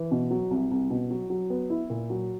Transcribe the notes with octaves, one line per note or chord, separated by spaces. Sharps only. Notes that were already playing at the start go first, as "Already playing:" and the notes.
Already playing: E3
B2
F#3
C2
C2
B2
F#3
F#3
B3
E4
A#2
F#3